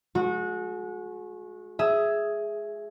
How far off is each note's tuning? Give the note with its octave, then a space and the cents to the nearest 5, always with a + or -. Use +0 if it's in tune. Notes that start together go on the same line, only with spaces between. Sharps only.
G#3 +35 F#4 -25
G#4 +5 E5 +0